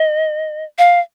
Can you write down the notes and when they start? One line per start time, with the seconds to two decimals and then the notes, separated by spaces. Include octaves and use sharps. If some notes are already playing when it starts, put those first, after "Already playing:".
Already playing: D#5
0.78 F5